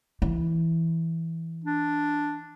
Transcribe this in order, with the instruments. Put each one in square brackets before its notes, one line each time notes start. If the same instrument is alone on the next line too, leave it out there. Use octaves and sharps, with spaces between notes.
[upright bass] E3
[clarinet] D4